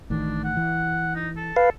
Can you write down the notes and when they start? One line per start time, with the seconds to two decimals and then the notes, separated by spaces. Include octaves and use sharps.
0.10 A1 A2 D#3 D4
0.44 F#5
0.57 E3
1.15 D#4
1.37 A4
1.56 B4 F5